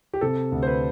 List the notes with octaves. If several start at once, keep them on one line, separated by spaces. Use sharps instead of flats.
G4
C3 A4
D2
C5
B4